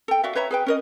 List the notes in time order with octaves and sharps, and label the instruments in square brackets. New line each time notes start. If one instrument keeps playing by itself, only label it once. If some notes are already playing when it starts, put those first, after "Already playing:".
[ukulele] A4 G5
F#4 D5 E5 F5
B4 C#5 E5 A#5
G#4 B4 G5
C#4 A#4 D#5